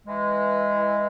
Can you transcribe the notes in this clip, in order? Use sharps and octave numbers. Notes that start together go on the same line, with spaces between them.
E3 G#3